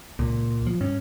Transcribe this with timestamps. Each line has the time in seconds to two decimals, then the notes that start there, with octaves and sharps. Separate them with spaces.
0.19 C#2 A#2
0.67 F3
0.81 G2 C#4